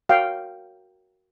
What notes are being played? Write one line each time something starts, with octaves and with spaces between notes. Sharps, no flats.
F#4 A#4 C#5 F5 G5